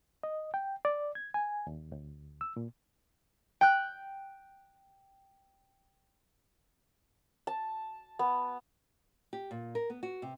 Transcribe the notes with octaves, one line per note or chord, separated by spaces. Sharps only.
D#5
G5
D5
G#6
G#5
D#2
D2
E6
A#2
G5 F#6
A5
B3
G4
A#2
A#4
B3
F#4
C3